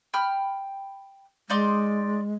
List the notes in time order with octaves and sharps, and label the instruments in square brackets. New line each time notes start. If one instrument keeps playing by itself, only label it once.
[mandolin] G5 B5 F6
[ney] G#3 [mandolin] D#4 D5 C6